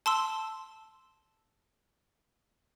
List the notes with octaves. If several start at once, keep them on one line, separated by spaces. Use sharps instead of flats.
A5 C6 E6